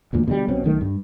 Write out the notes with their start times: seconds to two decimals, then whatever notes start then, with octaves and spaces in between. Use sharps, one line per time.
0.13 E1 D2 A#2
0.28 B2 D3 F3 G3
0.48 B1 B2 C4 C#4
0.64 B1 D#3 A3
0.81 G2